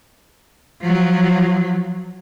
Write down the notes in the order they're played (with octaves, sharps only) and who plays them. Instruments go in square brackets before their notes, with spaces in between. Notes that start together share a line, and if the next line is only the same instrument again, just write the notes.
[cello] F3 F#3